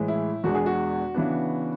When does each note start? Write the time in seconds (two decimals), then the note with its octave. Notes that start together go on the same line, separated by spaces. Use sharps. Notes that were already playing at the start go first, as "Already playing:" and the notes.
Already playing: A2 E3 G#3
0.08 E4
0.43 E2 B2 G#3 D4 F#4
0.55 G#4
0.66 F#4
1.14 C#3 E3 B3 D4